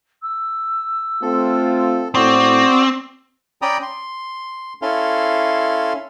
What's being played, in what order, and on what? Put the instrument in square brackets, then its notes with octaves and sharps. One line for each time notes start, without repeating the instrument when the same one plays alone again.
[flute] E6
[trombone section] A3 C4 F4 [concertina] A4
[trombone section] A2 [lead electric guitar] C4 [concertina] F#4 D5 D#6
[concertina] C#4 D5 G5 A#5 B5 D#6
C6
C#4 E4 A4 F5 C6